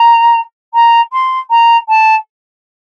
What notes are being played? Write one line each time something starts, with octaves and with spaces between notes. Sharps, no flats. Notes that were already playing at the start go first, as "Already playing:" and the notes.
Already playing: A#5
A#5
C6
A#5
A5